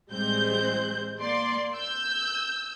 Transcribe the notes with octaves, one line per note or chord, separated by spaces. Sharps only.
A1 G3 G#3 C4 C5 G6
A#3 D5 C6
E6 G6